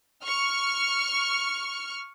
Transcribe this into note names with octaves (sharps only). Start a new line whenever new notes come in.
C#6 F6